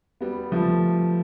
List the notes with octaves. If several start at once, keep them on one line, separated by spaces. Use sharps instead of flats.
G3 B3
F3 A3